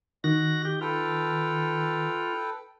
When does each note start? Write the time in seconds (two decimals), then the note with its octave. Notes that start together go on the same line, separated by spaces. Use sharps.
0.24 D#3 F#4 D#5 A#6
0.65 G4
0.81 F4 A4 B4 G5